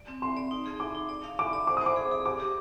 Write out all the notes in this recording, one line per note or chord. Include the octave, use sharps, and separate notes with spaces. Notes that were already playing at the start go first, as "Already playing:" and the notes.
Already playing: D5
C4
C4 C6
D5
D#4
G#4
D#4 D6
D#4
D5
F5
F5 D6
D5
C5 D6
D#6
C5 D6
G#4
G#4
G4 D6
G4